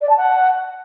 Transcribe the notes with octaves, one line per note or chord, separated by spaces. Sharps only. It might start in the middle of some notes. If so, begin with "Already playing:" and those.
D5
A5
F#5